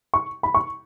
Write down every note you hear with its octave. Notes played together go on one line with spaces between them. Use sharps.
C#6
B5
C#6